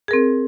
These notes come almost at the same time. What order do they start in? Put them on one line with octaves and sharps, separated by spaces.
G#4 A#4 C4